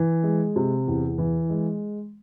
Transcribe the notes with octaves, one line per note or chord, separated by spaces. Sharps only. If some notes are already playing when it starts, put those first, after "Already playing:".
Already playing: E3
G#3
C3
E2
E3
G#3